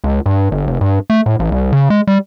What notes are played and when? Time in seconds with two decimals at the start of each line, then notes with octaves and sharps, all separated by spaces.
0.04 C#2
0.26 G2
0.51 G1
0.67 F1
0.81 G2
1.10 A3
1.26 A2
1.39 A1
1.52 C2
1.73 C#3
1.90 G#3
2.07 G3